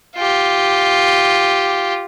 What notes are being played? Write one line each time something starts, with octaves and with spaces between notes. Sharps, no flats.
F4 G4